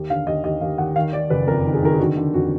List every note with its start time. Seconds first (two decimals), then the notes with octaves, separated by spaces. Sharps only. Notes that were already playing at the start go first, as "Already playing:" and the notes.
Already playing: D#2
0.10 D3 F5
0.27 D#2 D#5
0.44 D#2 D#5
0.61 D#2 F5
0.78 D#2 F#5
0.96 D#3 F5
1.13 D#3 D5
1.30 F#1 B4
1.47 F2 A#4
1.65 D#3
1.74 G#4
1.82 D#3 A#4
1.92 G#4
1.99 D3 F#4
2.16 D3
2.34 F2 F#4